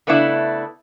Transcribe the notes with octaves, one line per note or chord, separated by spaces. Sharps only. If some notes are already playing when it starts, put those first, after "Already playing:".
C#3 A3 B3 D4 E4